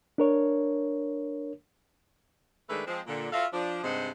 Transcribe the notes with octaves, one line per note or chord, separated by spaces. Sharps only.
D4 A#4 C#5
D#3 G#3 A3 D4 A4 B4
F3 G#3 C4
A#2 D3
F4 F#4 A4 E5 F5
F3 D4
G2 C3 G#3 D#4 C5 F#5